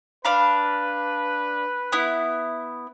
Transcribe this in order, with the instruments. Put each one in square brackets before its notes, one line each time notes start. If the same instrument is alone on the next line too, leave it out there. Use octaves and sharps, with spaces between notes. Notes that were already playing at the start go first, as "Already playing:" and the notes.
[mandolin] D4 F5 B5 [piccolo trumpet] B4
[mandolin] B3 E4